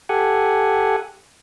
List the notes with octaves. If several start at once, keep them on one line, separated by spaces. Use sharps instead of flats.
G4 A4 F#5 G#5